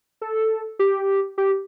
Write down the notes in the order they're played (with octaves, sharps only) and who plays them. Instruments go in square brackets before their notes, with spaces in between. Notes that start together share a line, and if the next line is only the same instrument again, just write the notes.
[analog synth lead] A4
G4
G4